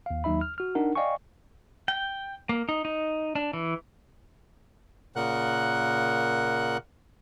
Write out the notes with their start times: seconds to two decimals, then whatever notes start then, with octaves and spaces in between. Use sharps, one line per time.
0.06 D#2 F5
0.24 D#2 F#3 D#4 E5 B5
0.41 F6
0.58 F#4 F6
0.75 D4 D#4 A#4 F#5
0.95 D5 D#5 F5 G5 G#5 C#6
1.88 G5
2.49 A#3
2.69 D#4
2.85 D#4
3.35 D4
3.53 E3
5.16 A#2 C#3 A#4 F#5 F#6